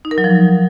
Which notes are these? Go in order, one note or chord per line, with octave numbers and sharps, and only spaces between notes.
D#4
A#4
F#3
F3